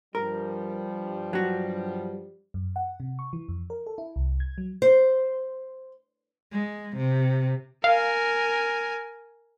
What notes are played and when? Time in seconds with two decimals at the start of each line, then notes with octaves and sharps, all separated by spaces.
0.15 G2 F3 G3 A#4
1.33 F#3 F#4
2.54 F#2
2.76 F#5
3.00 C3
3.19 C#6
3.33 E3
3.48 F2
3.70 A#4
3.87 A4
3.98 E4
4.16 C2
4.40 G#6
4.58 F#3
4.82 C5
6.53 G#3
6.97 C3
7.84 A#4 F5 G#5